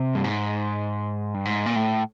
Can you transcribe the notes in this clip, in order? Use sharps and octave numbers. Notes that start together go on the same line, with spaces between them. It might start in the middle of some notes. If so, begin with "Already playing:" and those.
Already playing: C3
G2
G#2
G2
G#2
A#2
A2